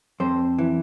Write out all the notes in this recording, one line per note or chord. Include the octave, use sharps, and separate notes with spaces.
F2 C5
E3